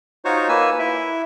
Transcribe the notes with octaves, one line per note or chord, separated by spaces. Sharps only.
D#4 F4 F#4 C5 C#5
A#3 B4 G#5 E6
E4 E5